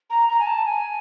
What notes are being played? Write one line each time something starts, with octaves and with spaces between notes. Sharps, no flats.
A#5
A#5
G#5
A5
G#5